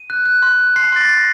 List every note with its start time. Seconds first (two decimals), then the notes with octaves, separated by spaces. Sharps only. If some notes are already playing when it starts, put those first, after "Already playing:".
Already playing: D#7
0.10 F#6
0.25 F#6
0.42 C6
0.59 F#6
0.76 C6 C7
0.92 C6 A6
1.00 A#6
1.09 C6